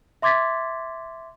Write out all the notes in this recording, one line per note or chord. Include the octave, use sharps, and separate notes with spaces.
E5 C6 D6 G#6 A6 B6